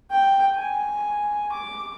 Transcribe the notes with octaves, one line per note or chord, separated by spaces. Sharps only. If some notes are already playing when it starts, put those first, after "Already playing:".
G5
G#5
D6